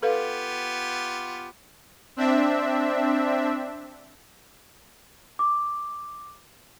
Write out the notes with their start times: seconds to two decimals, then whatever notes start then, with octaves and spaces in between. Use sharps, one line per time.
0.03 B3 F4 G4 A4 B4 F5
2.16 C4 D4 E5
5.39 D6